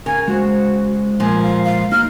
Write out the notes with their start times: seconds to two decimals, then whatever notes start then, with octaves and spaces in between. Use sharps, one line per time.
0.06 C#3 A#4 G#5
0.28 G#3 F#4 C5
1.20 A#2 F3 G#5
1.43 F5
1.64 F5
1.92 A#3 D#4 F#4 F6